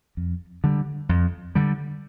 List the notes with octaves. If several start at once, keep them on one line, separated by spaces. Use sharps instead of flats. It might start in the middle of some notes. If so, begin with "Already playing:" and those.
F2
D3 G3
F2
D3 G3